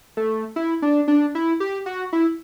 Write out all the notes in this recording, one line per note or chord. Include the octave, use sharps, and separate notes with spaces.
A3
E4
D4
D4
E4
G4
F#4
E4